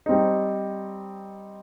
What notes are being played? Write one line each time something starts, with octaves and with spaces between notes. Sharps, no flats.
G3 C4 D#4